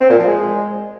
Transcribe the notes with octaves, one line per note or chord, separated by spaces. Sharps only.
C4
A#2
F3
G#3